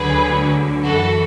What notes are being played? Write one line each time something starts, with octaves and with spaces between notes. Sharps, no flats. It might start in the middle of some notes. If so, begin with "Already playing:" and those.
Already playing: D2 D3 F#3 G#4 B4
F#2 E3 F#4 A4